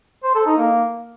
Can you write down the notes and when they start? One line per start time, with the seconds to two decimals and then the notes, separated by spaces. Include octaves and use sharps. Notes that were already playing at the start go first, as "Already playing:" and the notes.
0.24 C5
0.35 A4
0.46 D#4
0.58 A#3